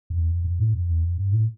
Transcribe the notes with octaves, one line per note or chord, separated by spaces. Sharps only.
F2
E2
F2
F2
A2
F2
E2
F2
G2
A2